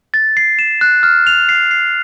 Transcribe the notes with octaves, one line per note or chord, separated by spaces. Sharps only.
A6
C7
E7
F#6
F6
F7
C7
C7